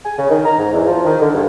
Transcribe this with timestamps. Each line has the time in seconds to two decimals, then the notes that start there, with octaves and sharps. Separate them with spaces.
0.05 G#5
0.18 C#3
0.30 D#3
0.46 A#5
0.58 G#2
0.74 E2
0.87 F3
1.04 D#3
1.21 D3
1.34 G2